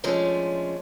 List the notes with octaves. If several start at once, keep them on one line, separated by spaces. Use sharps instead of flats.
F3 G#3 A3 C#4 D4